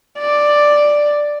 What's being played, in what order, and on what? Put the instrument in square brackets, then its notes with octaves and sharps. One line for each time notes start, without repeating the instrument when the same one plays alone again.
[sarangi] D5